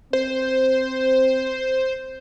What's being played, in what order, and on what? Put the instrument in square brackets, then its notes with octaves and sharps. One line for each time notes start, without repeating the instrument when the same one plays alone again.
[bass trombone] C4 [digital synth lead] C5